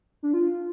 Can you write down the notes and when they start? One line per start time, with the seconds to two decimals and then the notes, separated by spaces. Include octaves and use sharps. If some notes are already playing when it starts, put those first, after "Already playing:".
0.23 D4
0.33 F4